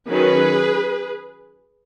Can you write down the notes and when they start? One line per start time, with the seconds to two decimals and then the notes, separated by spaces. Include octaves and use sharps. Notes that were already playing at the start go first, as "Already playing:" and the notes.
0.09 D#3 F#3 C#4 G#4 B4